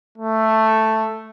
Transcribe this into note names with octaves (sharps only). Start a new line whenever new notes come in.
A3